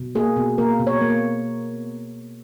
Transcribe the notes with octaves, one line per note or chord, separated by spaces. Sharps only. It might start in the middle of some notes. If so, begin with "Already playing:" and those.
Already playing: B2
A#3 G#4
B2
A#3 A#4
B2
C#5
A#3